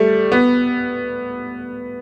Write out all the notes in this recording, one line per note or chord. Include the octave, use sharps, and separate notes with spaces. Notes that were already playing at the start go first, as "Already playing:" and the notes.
Already playing: G3 A3
B3